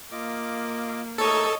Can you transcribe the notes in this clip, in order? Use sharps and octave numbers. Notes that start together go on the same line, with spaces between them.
A#3 F4 D#5 D6
A3 D#4 A4 A#4 C#5 D#5